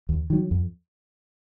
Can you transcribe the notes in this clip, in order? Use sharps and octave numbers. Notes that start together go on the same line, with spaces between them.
D#2
D#3 F#3
F2